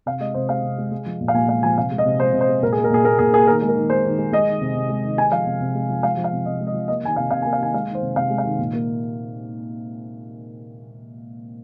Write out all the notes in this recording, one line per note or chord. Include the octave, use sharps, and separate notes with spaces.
C3 F5
G#3 D#5
C3 C5
G#3 F5
C3
G#3
G#3
F3
A#2
F5
A#2 G#5
G#3 F5
F3 G#5
C3 F5
G#3
D#5
C3
G#3 C5
C3
C5
G#3
A#2 A#4
G#4
A#3
A#4
A#2 G#4
A#3 A#4
A#2 G#4
A#3 G#4
D#3 A#4
G#3
A#4
D#3
G#3 C5
D#3
G#3
G#3 D#5
D#3
C3
C3
G#3
D#3
G#3 G#5
F3 F5
C3
C3
G#3
F3
G#3 F5
F3
F5
C3
C3 D#5
G#3
D#5
F3
A#3 D#5
D#3 G#5
C3 F5
C3 F5
G#5
A#3
F5
D#3 G#5
G#3 F5
D#3
C5
C3
C3 F5
G#3
F5
D#3
A#2
A#3